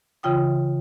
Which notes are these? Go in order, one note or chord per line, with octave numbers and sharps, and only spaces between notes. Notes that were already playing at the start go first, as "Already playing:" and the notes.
C#3 E3 F4 G5 D#6